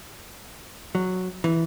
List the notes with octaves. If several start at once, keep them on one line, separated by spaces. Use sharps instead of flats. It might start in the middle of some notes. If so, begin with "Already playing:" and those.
F#3
E3